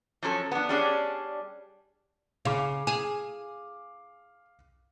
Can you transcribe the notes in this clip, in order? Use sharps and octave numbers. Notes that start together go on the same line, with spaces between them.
F3 F#3 C#4 A4
B3 D4
G3 C#4 D4 G#4
C#3 F5 D6
G#4